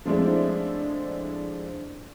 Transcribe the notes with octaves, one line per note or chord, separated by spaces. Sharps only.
F3 G#3 A3 C4 D4 E4